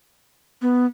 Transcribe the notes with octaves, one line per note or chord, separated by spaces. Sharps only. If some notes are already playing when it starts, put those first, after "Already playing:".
B3